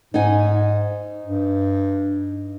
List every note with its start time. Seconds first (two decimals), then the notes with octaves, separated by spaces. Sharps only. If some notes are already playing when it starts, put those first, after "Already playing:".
0.14 G#2 D#4 F#5 G#5
1.24 G2